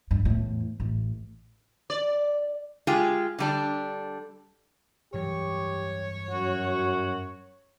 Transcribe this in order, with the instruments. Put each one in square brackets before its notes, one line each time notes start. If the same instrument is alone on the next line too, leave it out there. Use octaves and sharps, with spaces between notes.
[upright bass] G2
E2 A2
A1
[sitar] D5
[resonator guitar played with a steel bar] G#3 F4 G4 G#4
D3 G3 D4
[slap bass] G2 E3 F#3 [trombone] G4 [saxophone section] C#5
[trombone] F#2 [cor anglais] F#4